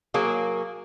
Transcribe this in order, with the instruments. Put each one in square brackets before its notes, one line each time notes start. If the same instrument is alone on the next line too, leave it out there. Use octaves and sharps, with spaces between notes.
[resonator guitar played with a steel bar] F#3 A#3 G#4